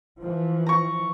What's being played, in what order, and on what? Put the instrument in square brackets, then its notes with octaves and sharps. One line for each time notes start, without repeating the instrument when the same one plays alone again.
[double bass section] E3 F3
[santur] A#5 C#6